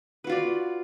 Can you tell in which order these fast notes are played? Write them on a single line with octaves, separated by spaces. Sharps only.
B4 F#4 F4 D5